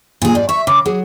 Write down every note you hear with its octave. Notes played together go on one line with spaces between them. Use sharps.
A#2 G#4
G#2 D5
E5 C#6
C#3 D6
F#3 G#4